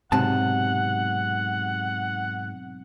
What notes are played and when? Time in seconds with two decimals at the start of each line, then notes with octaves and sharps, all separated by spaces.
0.12 B1 G#2 C3 F#5 A5